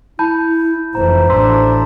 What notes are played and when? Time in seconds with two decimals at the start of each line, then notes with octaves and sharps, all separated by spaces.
0.19 E4 A5 B5 G6
0.95 F1 E3 C5 A#5
1.30 A1 D4 C6 E6 B6